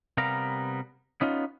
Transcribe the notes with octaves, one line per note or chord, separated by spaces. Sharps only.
C3 G3 B3 A#4 F5 A#5
B3 C#4 D#4 F4